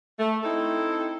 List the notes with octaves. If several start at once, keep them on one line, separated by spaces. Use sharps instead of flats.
A3
C4 D#4 E4 A4